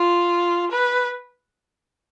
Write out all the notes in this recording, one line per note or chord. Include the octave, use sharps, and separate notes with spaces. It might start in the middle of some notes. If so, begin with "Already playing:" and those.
Already playing: F4
B4